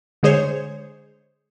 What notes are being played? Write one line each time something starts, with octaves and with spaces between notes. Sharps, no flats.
D3 G#3 G#4 C5 C#5